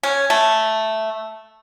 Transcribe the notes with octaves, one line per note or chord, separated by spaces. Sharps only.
C#4
A3